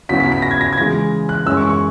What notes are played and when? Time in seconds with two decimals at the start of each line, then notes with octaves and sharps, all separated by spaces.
0.09 C#3 F#3 B3 E4 B6
0.20 B6
0.32 B6
0.42 A#6
0.51 G#6
0.61 A#6
0.73 G#6
0.77 C#3 E3 G#3 A#6
1.29 F#6
1.46 F#2 E3 G#3 C#4 E6
1.57 C#6
1.69 C#6